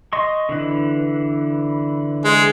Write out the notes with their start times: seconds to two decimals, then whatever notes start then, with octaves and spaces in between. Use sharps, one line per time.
0.13 D#5 C6 C#6
0.49 D3 E3 B4
2.24 G#3